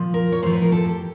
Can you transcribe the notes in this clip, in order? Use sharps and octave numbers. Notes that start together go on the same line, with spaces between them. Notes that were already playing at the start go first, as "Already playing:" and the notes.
Already playing: A#2 F3
A#4
C#5
A2 F3 C5
B4
A#4
A4
G4